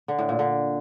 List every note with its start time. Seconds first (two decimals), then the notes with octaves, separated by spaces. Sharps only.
0.08 D3
0.19 A2
0.29 A#2
0.39 D3